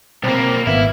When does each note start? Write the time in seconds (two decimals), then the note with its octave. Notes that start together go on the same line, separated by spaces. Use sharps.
0.23 B1 A#3 C4 B5
0.67 G#1 B3 E4 F5